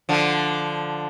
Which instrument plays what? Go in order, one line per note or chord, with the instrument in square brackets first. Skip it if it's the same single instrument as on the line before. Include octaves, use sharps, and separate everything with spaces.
[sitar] D3 F3